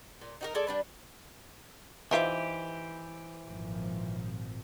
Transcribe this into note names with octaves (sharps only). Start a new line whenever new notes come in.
A#2
D#4 F#4 A#4
G#3 A4 D5 G#5
G3 D4 B4
E3 D#4 F4 G4 B4 C5 E5
G#1 A#2 F3